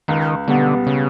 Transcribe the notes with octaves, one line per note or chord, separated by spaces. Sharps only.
C#2 D#3
B2 D3 G3 B3
C#3